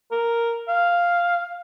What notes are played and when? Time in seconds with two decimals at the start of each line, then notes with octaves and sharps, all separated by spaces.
0.12 A#4
0.68 F5